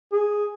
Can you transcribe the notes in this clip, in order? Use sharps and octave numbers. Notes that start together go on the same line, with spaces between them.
G#4